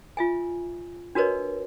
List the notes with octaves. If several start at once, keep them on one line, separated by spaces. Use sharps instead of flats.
F4 E5 G#5
D4 F#4 A#4 B4 C#5 D#5